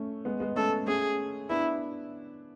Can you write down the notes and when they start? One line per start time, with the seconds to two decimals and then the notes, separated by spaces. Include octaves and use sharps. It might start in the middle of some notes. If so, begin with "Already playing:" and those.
Already playing: A3 C#4
0.25 G#3 B3
0.40 G#3 B3
0.56 A3 C#4 A4
0.87 A3 C#4 G#4
1.50 B3 D4 E4